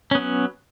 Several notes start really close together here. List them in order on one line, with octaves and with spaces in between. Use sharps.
C#4 B3 F#3